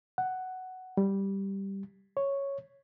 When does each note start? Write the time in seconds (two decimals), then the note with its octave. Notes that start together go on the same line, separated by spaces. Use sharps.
0.18 F#5
0.97 G3
2.17 C#5